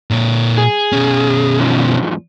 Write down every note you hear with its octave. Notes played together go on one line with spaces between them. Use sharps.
A#2 C#5
G#4
B2 C#4
E2 G#2 F3